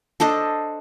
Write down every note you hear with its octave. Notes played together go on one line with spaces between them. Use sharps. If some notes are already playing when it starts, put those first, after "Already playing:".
D4 A4 C5 D#5